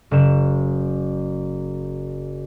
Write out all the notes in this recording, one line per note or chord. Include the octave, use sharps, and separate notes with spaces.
F#1 E7